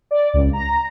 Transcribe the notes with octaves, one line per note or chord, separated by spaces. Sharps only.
D5
C#2
A#5